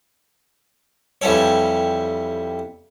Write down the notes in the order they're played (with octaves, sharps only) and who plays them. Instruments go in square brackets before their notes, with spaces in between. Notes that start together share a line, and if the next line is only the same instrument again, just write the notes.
[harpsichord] F2 E3 G3 A4 C#5